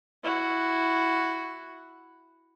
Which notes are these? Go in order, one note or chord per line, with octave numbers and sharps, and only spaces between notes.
E4 F#4